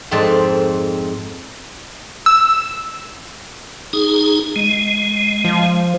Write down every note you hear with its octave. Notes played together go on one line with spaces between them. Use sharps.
F2 G#2 C4 D5 A5
E6
D#4 G#4
G#3
F3